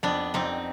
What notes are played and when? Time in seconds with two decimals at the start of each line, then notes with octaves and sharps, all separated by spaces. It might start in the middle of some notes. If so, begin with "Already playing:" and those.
0.03 F2 B3 D4
0.34 F2 C4 D#4